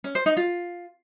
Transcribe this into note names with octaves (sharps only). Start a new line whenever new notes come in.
C#4
C5
D#4
F4